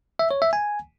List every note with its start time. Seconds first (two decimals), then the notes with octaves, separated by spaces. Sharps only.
0.19 E5
0.31 C#5
0.42 E5
0.53 G#5